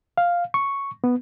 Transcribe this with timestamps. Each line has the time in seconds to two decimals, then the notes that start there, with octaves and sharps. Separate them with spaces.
0.18 F5
0.54 C#6
1.04 B3